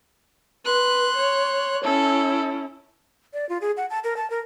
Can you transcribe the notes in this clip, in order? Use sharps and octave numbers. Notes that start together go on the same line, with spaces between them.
B4 C6 F#6
C#5
C#4 E4 A4
D5
F4
G#4
F#5
A5
A#4
A5
A#4